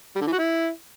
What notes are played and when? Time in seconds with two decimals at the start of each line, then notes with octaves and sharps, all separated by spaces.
0.16 G3
0.21 D3
0.27 E3
0.33 F#4
0.39 E4